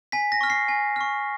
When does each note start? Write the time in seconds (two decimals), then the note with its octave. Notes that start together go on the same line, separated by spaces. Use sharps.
0.12 G#5 B6
0.32 A#6
0.41 C#6 F6
0.50 C7
0.68 G#5
0.96 C#6 F6